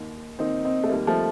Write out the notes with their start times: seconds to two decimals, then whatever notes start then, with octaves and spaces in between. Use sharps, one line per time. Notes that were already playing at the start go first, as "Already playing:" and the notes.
Already playing: D#2 D#3
0.39 D#2 D#3 C4 D#4
0.65 C4 D#4
0.84 A3
0.90 D#2 D#3 G3 A#3
1.07 F3 A3